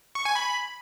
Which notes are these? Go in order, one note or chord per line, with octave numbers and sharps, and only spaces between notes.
C#6
G#5
B5